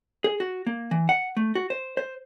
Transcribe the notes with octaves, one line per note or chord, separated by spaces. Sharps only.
G#4
F#4
A#3
E3
F#5
A3
F#4
C5
C5